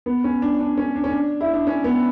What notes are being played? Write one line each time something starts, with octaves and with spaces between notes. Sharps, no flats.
B3
C#4
D4
D4
C#4
D4
C#4
D4
E4
D4
C#4
B3